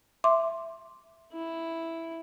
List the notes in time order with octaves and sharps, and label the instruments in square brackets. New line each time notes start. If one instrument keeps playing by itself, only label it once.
[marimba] E5 C6 D6
[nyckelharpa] E4